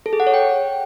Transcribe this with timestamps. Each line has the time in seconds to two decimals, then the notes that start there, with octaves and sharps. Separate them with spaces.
0.06 A4
0.13 G#4
0.20 F#5
0.27 C#5
0.34 G5